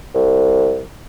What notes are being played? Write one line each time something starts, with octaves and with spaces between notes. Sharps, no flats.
C2